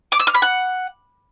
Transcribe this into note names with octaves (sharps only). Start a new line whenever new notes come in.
D6
E6
F6
B5
F#5